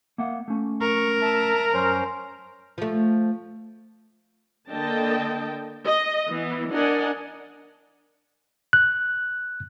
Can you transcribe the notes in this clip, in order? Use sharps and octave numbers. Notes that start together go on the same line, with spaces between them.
A#3 E5 F#5
A3 C#4
A#4 C#6
E5 A5
F#2 C#4 C5
F3 A3
D3 A#3 D#5 G5 A5
D#5
E3 B3
D4 A#4 D5 D#5 F#5 G#5
F#6